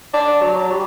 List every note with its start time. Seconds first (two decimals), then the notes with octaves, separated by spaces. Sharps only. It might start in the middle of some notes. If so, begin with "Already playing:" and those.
0.14 D4
0.42 F#3
0.71 G3